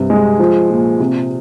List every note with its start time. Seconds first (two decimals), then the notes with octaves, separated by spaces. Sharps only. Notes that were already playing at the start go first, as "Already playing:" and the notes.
Already playing: G2 C3
0.10 G#3
0.39 F3
0.70 A#2
1.00 C3